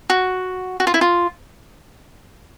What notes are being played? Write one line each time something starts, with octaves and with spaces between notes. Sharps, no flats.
F#4
F#4
F4
E4
F4